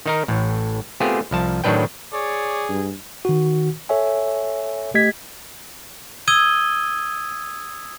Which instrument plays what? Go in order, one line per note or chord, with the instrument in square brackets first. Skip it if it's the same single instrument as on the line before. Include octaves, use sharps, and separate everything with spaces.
[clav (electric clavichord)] D#3 D#4 A#4
A1 A2
A3 B3 C4 F4 G4 G#4
C2 F3 A5
A2 D#3 F#3 D4 B4 G5
[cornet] G#4 [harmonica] C#5 D5
[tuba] G2
[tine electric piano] D#3 F#4
A4 C#5 E5 G#5
A3 G4 D#5 G#6 B6
[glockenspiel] D#6 E6 G#6 D#7 G7